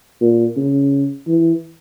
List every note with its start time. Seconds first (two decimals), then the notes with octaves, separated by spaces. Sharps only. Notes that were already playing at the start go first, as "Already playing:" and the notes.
0.21 A#2
0.57 C#3
1.27 E3